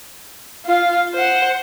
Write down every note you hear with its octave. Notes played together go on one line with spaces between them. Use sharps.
F4 F5
C5 F#5